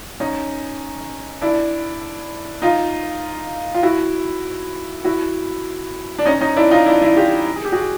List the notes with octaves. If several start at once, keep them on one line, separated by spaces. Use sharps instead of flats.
C#4 D#4
D4 E4
D#4 F4
F4
E4 F#4
E4 F#4
D4
C#4 D#4
C#4 D#4
D4 E4
D#4 F4
D4 E4
D4 E4
F4 G4
G#4
G4
F#4 G#4